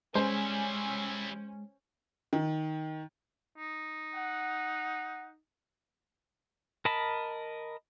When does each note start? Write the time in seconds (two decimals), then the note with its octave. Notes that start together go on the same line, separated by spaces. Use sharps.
0.15 G3 G#3 C#4 E4 C5
2.33 D#3
3.58 D#4
4.15 F#5
6.85 A#4 D#5 A5 B5